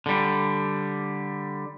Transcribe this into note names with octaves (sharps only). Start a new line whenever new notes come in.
D3 G3